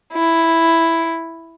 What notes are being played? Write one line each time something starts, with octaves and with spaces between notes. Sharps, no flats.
E4